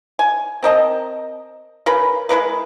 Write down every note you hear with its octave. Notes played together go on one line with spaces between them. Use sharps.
G#5
C4 A#4 D#5 A5
C#3 A#4 B4 B5
G#3 E4 A#4 B4